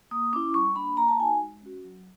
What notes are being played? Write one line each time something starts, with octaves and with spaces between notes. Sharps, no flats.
A#3 D#6
C#4 E4 D6
G3 C#6
A#3 D4 B5
A#3 A#5
A5
D#4 F#4 G#5
G#3
C#4 F#4
F#3